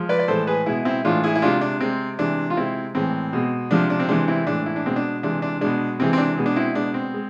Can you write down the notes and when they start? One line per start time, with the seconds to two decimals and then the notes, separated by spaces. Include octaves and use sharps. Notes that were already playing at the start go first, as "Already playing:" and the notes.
Already playing: F3 G#3
0.09 B4 D5
0.19 D5
0.28 A2 E3 G#3 A4 C5
0.47 G#4 B4
0.66 B2 G#3 E4 G#4
0.85 C4 E4
1.04 A2 E3 G#3 D4 F4
1.24 E4 G#4
1.35 E4
1.42 C3 G#3 D4 F4
1.61 D4
1.80 C3 G#3 C4
2.19 C3 E3 G#3 D4
2.50 F4
2.57 C3 G#3 C4 E4
2.95 A2 E3 G#3 C4
3.33 B2 G#3
3.71 C3 F3 G#3 D4
3.90 D4
3.99 C4
4.09 C3 E3 G#3 D4
4.28 C4 E4
4.47 A2 E3 G#3 D4
4.66 E4
4.76 D4
4.86 B2 G#3 C4
4.96 D4
5.23 C3 E3 G#3 D4
5.42 D4
5.61 B2 G#3 D4
6.00 C3 E3 G#3 C4
6.13 C4
6.18 D4
6.38 B2 G#3
6.46 D4
6.56 C4 E4
6.75 B2 G#3 D4
6.94 C4
7.14 G#3